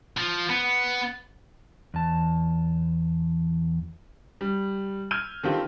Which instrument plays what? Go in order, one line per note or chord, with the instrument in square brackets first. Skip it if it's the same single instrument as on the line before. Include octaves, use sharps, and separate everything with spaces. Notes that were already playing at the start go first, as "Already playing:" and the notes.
[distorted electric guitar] F3
B3
[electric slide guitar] E2 A5
[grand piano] G3
E6 F6 G6 G#6 D#7
D3 D#3 C4 F4 G4